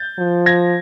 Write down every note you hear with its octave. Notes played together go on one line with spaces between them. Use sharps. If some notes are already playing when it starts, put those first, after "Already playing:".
Already playing: G6 A6
F3
G#6 A#6